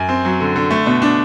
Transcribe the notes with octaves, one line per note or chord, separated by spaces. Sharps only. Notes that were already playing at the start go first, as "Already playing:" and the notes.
Already playing: F#2
C4
F#3
D3
D3
A3
B2
D4